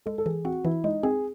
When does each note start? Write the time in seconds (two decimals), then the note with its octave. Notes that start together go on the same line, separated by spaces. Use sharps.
0.06 G#3 A4
0.18 A4
0.26 E3 G#4
0.45 C4 F#4
0.65 E3 E4
0.84 G#3 D#4
1.03 C4 G#4